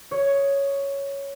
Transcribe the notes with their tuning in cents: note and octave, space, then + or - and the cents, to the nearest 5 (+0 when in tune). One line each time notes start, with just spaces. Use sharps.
C#5 +5 D#6 +0